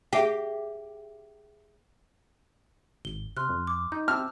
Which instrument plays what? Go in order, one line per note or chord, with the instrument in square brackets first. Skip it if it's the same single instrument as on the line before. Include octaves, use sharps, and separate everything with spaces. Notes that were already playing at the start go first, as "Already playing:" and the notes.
[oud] G4 [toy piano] G#4 E5 F#5
[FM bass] G#1 [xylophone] G7
[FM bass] C3 [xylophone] C6 F6 F#6
[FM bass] F2
[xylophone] D6
[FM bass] D#4 [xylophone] G6
[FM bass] C4 [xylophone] A5 D6 E6 [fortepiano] F6